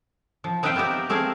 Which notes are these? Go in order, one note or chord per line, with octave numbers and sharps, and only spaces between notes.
F3
C4 D#4 B4 E5 F5 G5
B3 C4 G4 A#4
A3 C4 G#4 A#4 F5